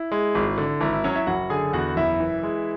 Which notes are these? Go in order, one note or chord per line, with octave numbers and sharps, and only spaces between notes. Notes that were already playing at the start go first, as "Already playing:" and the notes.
Already playing: E4
G#3
G#1
D3
G#1 E4
E4
F#3 C#4 C#5
E4 E5
F#1 F#4 F#5
D3 G#4 G#5
E2 F#4 F#5
F#1 E4 E5
E3
G#3